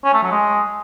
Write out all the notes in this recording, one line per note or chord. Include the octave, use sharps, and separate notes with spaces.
C#4
A3
F#3
G#3